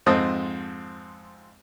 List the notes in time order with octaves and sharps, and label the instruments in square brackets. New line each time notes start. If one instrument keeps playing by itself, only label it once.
[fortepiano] F2 G#2 C4 D#5 A5 D#6